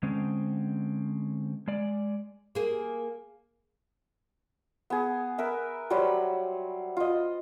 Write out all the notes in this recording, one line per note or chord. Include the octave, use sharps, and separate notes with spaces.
D3 G#3 C4 C#4
G#3 D5
A#3 G#4
B3 G#4
A#4 B4 E5
F#3 G3 C5 B5
F4 D#5